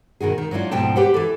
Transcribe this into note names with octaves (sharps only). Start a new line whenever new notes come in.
B2 D#3 F#4 G#4
D#3
F#3 C#4 D4 E4 F4
D2 G#2 B2 F3 G5 A5
G4 B4 C5 F#5
E3 A4